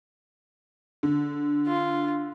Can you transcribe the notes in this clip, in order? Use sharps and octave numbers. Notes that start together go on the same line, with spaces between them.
D3
F4